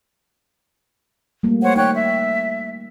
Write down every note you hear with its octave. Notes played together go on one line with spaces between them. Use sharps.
G3 A3 A#3
C5 C#5 F#5
D#4 C#5 G5 F#6
E5